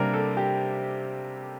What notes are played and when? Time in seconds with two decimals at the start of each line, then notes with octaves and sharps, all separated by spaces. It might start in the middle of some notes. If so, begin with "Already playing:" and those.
Already playing: C3 G3 A#3 D4 A#4
0.13 A4
0.37 G4